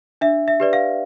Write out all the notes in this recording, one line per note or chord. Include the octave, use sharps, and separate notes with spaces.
D4 E5
E5
G4 B4 D5
F5